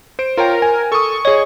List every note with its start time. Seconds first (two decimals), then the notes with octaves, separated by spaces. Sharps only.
0.19 C5 D7
0.37 F4 A#4 C#5 G5
0.62 G#5
0.92 A4 C#6 D#6
1.25 G#4 C#5 D#5